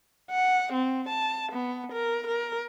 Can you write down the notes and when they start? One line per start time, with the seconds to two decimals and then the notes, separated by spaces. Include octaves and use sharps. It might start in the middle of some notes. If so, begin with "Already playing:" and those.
0.30 F#5
0.73 C4
1.09 A5
1.52 B3
1.92 A#4
2.27 A#4